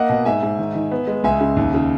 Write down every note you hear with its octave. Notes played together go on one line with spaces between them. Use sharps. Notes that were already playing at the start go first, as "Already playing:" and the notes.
Already playing: A#3 D#5 F#5
B2
G#2 E5 G#5
G#2
D#3
D#3
B3
G#3
C#2 E5 G#5
C#3
D#2
C#3